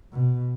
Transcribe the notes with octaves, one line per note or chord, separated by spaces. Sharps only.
B2